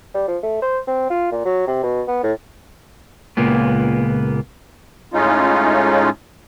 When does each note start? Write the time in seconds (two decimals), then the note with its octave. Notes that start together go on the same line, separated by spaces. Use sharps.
0.14 G3
0.28 F3
0.43 A3
0.62 C5
0.87 C4
1.10 F4
1.32 A#2
1.45 F#3
1.67 C3
1.83 B2
2.08 B3
2.23 A2
3.37 C#2 A#2 A#3 B3
5.14 A2 G#3 C#4 D#4 F4